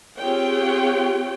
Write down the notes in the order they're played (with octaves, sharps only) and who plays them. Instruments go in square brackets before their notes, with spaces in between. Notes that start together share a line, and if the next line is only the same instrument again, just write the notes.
[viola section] C4 F4 G4 G#4 C#5 G5